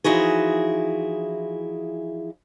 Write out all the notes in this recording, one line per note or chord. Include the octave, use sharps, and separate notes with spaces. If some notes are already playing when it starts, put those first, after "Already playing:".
E3 F3 D#4 E4 F#4 G#4